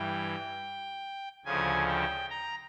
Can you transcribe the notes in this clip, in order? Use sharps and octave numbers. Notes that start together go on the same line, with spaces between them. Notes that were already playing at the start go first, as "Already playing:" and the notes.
Already playing: G2 E3 G5
D2 C#3 F3 G#5
G5
A#5